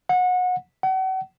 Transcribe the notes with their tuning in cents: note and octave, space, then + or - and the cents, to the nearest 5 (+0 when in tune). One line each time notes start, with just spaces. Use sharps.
F#5 -25
F#5 +40